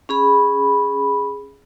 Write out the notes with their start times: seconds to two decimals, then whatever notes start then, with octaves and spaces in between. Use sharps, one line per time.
0.09 C#4 G#4 B5